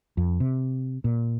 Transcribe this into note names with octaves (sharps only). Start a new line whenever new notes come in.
F2
C3
A#2